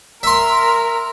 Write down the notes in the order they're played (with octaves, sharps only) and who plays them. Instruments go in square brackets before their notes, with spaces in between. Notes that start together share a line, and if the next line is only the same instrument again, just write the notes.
[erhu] A#4 [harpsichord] E5 C6